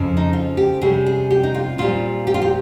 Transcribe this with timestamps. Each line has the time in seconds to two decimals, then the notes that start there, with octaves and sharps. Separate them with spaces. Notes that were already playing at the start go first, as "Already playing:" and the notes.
Already playing: F2 C#3 F3
0.17 D#4
0.33 F4
0.57 G4
0.81 C3 G3 C#4 G#4
1.06 G#4
1.31 G4
1.43 D#4
1.54 F4
1.78 A#2 G3 C4 F4
2.27 G4
2.34 F4
2.42 G4